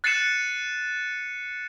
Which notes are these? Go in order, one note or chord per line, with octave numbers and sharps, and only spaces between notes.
F#6 A6 C7 C#7 D#7 E7